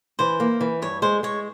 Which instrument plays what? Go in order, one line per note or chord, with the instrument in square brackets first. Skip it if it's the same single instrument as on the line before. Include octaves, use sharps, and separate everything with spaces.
[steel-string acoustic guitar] E3 [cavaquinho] C5
[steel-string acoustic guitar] A#3
E3
[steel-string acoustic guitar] G2 [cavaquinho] C#5
[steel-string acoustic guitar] G#3 [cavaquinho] C5
[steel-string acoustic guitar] G#3 [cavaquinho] C#5